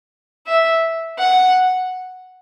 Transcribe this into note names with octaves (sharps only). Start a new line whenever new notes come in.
E5
F#5